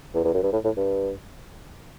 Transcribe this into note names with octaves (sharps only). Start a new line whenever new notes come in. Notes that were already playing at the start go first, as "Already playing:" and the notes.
E2
E2
F#2
G2
A2
A2
G2